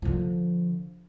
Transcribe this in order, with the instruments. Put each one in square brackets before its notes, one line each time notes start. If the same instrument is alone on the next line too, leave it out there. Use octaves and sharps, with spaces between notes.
[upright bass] D3 F3